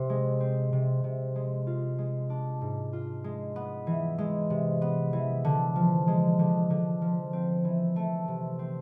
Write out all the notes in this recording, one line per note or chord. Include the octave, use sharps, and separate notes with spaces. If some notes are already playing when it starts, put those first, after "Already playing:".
Already playing: C3
G#3
C4
C3
C3
G#3
F4
G#3
D4
G#2
F4
G#3
B3
E3
G#3
C3
B3
E3
D3
F3
G#3
D3
D3
F3
C4
E3
A3
C3
C4